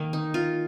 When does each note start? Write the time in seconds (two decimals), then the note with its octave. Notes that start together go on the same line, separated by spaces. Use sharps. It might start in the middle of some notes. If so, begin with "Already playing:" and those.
Already playing: D#3 A#3
0.13 D#4
0.34 F4